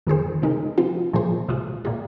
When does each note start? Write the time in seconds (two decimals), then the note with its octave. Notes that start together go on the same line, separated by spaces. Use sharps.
0.07 F2 D#3 A#3 G#4 C5
0.42 C3 G#3 D#4 A#4
0.78 F3 C4 F4
1.13 A#2 F3 A#3 G#4 C5
1.49 C3 G#3 F4
1.85 A#2 A#3 F4 G#4